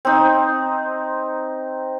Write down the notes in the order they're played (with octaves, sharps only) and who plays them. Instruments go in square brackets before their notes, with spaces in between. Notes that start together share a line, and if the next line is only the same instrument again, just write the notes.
[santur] C4 D#4